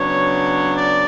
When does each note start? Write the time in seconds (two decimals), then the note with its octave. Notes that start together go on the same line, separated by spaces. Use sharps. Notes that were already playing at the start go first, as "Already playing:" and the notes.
Already playing: C#3 F#3 B3 D4 C#5
0.75 D5